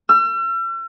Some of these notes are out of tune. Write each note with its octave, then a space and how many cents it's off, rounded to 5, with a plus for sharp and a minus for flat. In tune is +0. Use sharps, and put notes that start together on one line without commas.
E6 +45